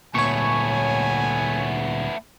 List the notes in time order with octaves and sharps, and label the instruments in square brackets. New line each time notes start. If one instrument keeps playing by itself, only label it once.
[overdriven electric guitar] D2 A#2 [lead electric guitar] A3 B3 [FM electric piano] C#5 C#6 [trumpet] G#5